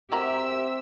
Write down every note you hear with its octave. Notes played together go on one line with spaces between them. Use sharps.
C4 E4 F#4 G4 A#4 E5 E6